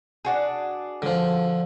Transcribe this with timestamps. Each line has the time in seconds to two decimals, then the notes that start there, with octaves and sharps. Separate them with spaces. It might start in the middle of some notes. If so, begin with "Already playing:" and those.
0.25 D4 F#4 G#4
1.02 D3 F3